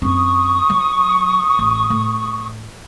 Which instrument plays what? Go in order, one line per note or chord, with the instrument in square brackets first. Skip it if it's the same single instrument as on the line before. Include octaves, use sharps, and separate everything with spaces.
[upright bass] F#2 C4 [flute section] C#6 D#6
[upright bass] F#3
A1
A2